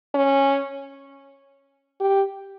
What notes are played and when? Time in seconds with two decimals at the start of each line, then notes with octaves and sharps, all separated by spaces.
0.14 C#4
2.00 G4